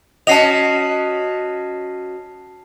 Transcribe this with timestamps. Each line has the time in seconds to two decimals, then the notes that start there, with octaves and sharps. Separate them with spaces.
0.27 C#4 F#4 D#5 A5 C7 F7